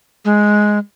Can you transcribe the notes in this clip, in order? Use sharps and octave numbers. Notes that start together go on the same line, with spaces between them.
G#3